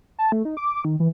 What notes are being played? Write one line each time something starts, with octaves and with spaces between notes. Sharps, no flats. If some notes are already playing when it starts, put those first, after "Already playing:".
A5
A3
D#4
D6
D#3
E3